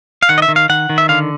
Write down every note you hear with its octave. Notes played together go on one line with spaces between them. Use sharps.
F5
D#3 F#5
D#5
E5
D#3
F5
D#3 F#5
D#3
E5
D3 F5